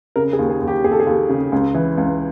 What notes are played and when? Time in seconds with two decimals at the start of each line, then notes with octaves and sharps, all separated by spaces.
0.16 C#3 A#4
0.33 G#4
0.39 D#2
0.50 G#4
0.61 D#2
0.67 G4
0.84 D#2 G#4
0.92 A4
1.00 G#4
1.07 D#2
1.29 C#3
1.52 C#2
1.75 E3
1.97 C#2